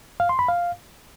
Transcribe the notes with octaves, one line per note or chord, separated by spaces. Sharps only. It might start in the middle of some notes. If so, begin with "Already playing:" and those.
F5
C6
B5
F5